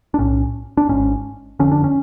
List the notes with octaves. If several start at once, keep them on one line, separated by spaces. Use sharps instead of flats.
D4
B1 A2 C#4
D4
G#1 G#2 C#4
F#1 F2 D3 C#4
D4
C#4